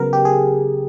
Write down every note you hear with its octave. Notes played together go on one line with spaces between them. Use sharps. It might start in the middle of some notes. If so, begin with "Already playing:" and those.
Already playing: C#3 F#3 B3 A#4
G4
G#4